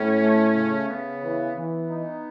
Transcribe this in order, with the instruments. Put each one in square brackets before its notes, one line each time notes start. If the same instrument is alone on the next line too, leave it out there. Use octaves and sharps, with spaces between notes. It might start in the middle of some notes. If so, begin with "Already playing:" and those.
Already playing: [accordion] A2 [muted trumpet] C#4
[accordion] A3
C#3
[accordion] C#3 [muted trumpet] B3
[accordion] E3
[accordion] E3 [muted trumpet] B3
[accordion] D#4